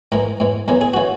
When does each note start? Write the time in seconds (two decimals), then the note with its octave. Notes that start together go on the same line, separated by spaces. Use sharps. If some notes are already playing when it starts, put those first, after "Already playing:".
0.12 G#2 E3 A#4
0.40 G#2 E3
0.68 E2 C#3 E3 A#4
0.81 G#4
0.94 C#3 E3 F#4